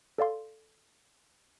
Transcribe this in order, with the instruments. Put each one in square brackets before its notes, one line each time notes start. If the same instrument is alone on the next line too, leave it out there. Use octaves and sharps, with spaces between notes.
[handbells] A4 D5 F5 C6